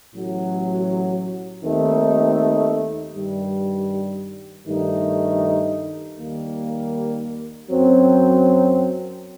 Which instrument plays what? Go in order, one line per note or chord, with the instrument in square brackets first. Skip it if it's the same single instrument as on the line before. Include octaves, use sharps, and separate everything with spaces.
[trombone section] A1 A2 F#3
D#2 D#3 A3 C4 D#4
G2 D#3 G3
G2 D#3 A3 D#4
D#2 D#3 G3 A#3
F#2 F#3 C4